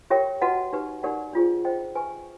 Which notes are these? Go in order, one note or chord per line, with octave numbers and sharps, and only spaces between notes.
G4 A#4 C#5 E5 G5
F#4 B4 D#5 F#5 A5
D#4 G4 B4
D#4 G4 A#4 D5 F#5
D4 F4 G#4 C5
C5 D#5 G5
B4 E5 G#5 C#6